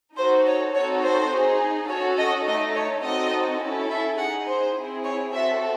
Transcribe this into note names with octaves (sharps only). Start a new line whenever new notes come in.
D#4 F#4 A4 C5
C#5
C4 D#4 F#4 A4 C#5
C5
D#4
G#4
C#4 F#4 A4 C#5
D#5
A3 D#4 A4 D#5
C#5
C4 D#4 F#4 A4 D#5
C#4 E4 A4
E5
D#4 G#4 F#5
C5
C4 E4 G#4
C#5
C4 F#4 A4 E5